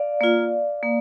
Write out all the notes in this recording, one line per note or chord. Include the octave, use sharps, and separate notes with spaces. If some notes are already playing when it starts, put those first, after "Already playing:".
Already playing: D5 F5
A#3 F4
A#3